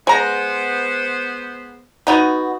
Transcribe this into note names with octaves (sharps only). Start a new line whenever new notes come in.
G#3 B3 C5 A#5
B3 D#4 F#4